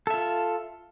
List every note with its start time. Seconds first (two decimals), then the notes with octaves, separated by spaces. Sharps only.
0.07 A4
0.10 E5
0.14 F4